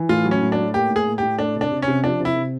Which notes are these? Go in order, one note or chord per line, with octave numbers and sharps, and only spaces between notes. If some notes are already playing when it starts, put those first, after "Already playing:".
Already playing: E3
A2 F4
F#3
C#4
A2
D4
A2
A#3 G4
A2
G#4
A2
A2 G4
A3 D4
C3
D4
C3
C#4
C3
F3 D4
C3 E4
C3